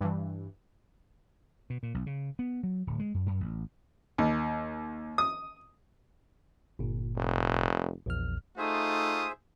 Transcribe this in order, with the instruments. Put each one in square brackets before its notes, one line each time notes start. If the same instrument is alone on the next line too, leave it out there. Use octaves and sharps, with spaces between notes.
[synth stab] G2 E3
[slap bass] B2
A#2
B1
C#3
B3
F#3
D1
G#3
F#2
F#2
A1
[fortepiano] D#2
D#6
[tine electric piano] G1 A#2
[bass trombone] F1
[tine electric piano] A#1 E2 F6
[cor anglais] A3 [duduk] D#4 [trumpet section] F4 D#6 [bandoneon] G#4 C5 E5